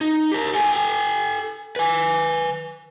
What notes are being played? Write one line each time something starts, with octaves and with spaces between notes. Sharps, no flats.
D#4
G4 A#4
A4 G5 G#5
B4 G#5